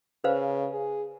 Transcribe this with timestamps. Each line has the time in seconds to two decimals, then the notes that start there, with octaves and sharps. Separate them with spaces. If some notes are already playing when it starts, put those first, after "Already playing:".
0.24 C#3 B4 C5 F5
0.72 G#4